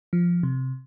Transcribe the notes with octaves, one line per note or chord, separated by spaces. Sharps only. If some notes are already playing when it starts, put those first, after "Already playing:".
F3
C3